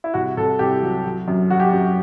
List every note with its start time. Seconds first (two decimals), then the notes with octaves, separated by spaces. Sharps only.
0.04 E4
0.14 C2 F#4
0.37 C2 A4
0.59 C2 G4
0.82 F#3
1.06 F#3
1.28 F#2
1.50 F#3 F#4
1.60 G4
1.69 F#2 F#4